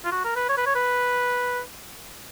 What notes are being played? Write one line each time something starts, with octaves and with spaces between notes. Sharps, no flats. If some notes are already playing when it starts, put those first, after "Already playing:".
F4
F#4
A#4
B4
C#5
B4
C#5
B4